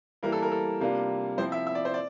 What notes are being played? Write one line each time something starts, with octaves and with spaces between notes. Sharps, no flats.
E3 G3 A#3 E4 A#4
A4
A#4
A4
C3 G3 A#3 D4 F4
F3 C4 E4 C5
E5
E5
D5
C5
D5